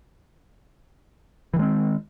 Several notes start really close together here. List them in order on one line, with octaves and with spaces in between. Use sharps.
E3 D#3 G#3 C4